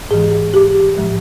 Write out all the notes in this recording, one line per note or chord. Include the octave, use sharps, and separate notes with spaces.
G#2 E3 G#3 G#4
G4
A2 F3 G#3